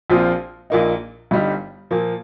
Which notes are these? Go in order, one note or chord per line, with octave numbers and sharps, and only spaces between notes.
A#1 A#2 F3 C4 F4
A#1 A#2 A#3 D#4
G1 G2 G3 D#4
A#2 F3 A#3